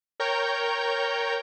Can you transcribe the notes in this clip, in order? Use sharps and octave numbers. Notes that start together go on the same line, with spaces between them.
A#4 C#5 G5 A#5 C#6 G6